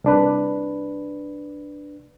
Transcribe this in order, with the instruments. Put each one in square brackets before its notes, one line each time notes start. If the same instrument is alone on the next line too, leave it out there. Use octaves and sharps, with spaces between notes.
[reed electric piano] C2 D4 B4